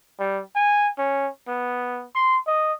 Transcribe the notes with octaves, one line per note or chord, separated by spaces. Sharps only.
G3
G#5
C#4
B3
C6
D#5